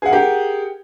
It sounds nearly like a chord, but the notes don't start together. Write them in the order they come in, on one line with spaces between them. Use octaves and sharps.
G#4 F#5 A#4 G4